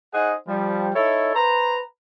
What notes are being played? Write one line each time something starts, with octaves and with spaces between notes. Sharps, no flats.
D#4 G#4 C5 D#5 F#5
F3 G3
D#4 E4 A4 C#5
B4 C5 A#5